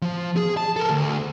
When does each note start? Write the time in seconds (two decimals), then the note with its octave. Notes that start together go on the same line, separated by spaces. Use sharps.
0.02 F3
0.37 G#4
0.57 A5
0.76 A4 A#4
0.90 D2